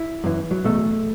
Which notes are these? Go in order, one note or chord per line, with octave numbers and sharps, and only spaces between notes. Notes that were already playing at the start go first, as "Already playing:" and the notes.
Already playing: E4
F#2 E3
F#3
E2 B2 A3